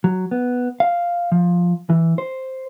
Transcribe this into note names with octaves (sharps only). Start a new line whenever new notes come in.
F#3
B3
F5
F3
E3
C5